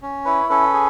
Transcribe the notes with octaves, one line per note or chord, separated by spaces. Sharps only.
C#4
E4 B4 C#5
C#4 A4 B4
G#4